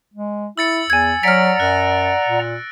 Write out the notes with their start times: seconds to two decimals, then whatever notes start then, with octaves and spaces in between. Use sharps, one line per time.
0.14 G#3
0.58 E4 E6 A6 C#7
0.90 E2 G#5 G#6
1.23 F#3 D5 F#5 A#5 F6 A#6 B6 D7
1.60 F#2 F#6
2.28 A#2